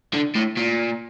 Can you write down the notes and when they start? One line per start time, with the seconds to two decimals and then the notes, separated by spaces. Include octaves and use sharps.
0.14 D3
0.35 A2
0.57 A#2